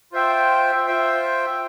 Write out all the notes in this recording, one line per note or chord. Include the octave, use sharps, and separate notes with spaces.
F4 C5 E5 G5
F4 C5 E5 G5